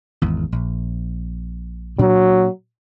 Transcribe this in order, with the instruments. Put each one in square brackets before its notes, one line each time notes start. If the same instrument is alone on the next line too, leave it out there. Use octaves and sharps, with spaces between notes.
[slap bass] G#1 E2
A#1
[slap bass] A#2 D4 [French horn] F#3